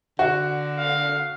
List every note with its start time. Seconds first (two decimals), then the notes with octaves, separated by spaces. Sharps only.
0.19 D3 F#4
0.78 F5